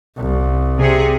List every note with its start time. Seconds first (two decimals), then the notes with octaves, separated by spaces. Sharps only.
0.17 C2
0.78 C3 G#4